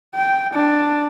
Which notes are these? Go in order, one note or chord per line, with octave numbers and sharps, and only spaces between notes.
G5
D4